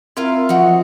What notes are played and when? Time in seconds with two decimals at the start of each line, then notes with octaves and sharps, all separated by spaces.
0.17 C4 E4 F4 A#4 F5
0.49 F3 D#4 F#4